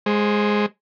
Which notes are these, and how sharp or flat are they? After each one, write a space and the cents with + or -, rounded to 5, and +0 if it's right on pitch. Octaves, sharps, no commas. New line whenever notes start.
G#3 +0 C5 +15